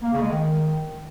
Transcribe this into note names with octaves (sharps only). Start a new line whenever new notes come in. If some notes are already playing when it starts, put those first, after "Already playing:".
A#3
C#3
G#3
D#3